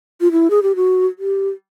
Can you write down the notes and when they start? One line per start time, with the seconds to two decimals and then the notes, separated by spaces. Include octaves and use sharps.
0.21 F4
0.32 E4
0.50 G#4
0.63 G4
0.76 F#4
1.19 G4